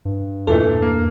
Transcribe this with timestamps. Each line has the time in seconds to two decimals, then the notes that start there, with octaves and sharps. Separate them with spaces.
0.05 G2
0.47 E2 A#2 E3 A3 A4
0.82 A#3